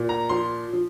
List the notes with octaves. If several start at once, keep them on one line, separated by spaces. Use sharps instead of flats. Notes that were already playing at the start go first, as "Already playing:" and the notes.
Already playing: A#2
A#5
F3 C6
F3